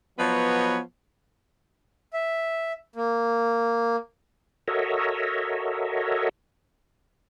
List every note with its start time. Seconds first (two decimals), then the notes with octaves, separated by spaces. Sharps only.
0.18 F3 F#3 B3 B4 C#5 D#5
2.13 E5
2.96 A#3
4.68 F#4 A4 A#4 C#5 D#5 E5